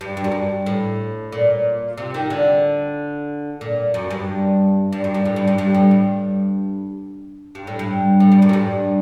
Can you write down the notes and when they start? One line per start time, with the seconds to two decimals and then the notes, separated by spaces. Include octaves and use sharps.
0.01 G2
0.17 G2
0.24 F#2
0.32 G2
0.66 A2
1.32 A#2
1.97 C3
2.14 D#3
2.30 D3
3.61 A#2
3.94 F#2
4.11 G2
4.93 G2
5.04 F#2
5.14 G2
5.25 A2
5.36 G2
5.47 G2
5.58 G2
5.75 A2
5.91 G2
7.55 G2
7.67 A2
7.79 G2
8.20 A2
8.32 G2
8.42 F#2
8.49 A2
8.53 G2